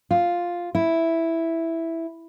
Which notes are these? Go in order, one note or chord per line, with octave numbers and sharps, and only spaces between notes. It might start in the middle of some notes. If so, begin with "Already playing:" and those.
F4
E4